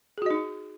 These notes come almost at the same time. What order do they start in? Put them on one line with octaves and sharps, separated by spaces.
G#4 F#4 D#5 D#4